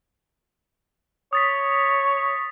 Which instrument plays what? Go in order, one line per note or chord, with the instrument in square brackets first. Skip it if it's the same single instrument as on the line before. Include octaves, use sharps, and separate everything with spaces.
[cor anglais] C#5 [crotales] D#6 A6 B6